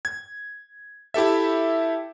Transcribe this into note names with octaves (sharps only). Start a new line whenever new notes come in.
G#6
E4 G4 A4 E5